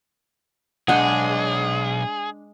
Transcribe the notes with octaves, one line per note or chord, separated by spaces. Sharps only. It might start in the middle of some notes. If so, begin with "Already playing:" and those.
B1 G#3 D4 G#4 D#5 F#5